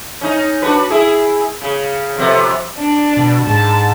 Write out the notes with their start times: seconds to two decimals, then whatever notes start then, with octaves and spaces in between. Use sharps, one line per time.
0.21 C#4 D#4
0.62 D4 F#4 B4
0.90 E4 G#4
1.62 C#3
2.17 F2 C3 B3
2.78 D4
3.17 B2
3.47 G#2 A5